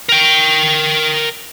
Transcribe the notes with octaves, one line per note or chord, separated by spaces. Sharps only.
A#4 G5